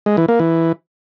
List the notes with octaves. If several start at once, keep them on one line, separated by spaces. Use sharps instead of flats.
G#3
E3
A#3
E3